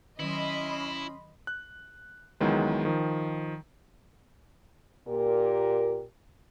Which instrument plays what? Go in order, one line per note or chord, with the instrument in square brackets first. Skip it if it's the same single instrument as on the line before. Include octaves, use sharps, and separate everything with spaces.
[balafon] D#3 F#3 [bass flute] C#4 [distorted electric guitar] E4 [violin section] D#5 B5 C6
[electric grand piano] F#6
C#2 D#3 E3 F#3 G#3 B3
D#3 F3
[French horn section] A#2 G4 A#4